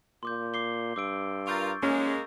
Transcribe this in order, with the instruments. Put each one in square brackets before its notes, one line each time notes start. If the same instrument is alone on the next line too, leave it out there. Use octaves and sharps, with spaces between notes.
[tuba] A#2 [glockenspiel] C6 D6 G6
[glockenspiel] D6 C7 G7
[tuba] G2 [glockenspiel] D6 E6 D7
[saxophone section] F4 A#4 [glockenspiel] C#6 G6 A6
[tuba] D#1 [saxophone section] G#3 A#3 [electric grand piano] C#4